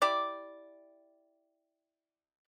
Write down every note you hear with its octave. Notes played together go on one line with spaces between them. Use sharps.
E4 G4 D5